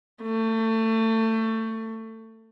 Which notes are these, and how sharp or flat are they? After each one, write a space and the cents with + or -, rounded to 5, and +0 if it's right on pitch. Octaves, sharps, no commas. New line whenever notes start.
A3 +25